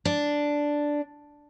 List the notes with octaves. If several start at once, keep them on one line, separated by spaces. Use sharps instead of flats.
D4